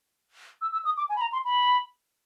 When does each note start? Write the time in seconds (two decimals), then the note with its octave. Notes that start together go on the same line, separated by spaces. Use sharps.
0.62 E6
0.73 E6
0.85 D#6
0.97 D6
1.09 G#5
1.16 B5
1.21 A#5
1.33 C6
1.45 B5